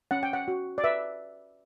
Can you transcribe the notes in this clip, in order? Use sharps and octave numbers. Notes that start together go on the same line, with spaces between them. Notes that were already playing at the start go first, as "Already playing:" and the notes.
C#4 F#5
G5
F#5
F#4
D5
B4 E5